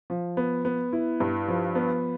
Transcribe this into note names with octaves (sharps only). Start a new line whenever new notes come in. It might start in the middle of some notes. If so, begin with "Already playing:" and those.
F3
B3
B3
E4
G2
F3
B3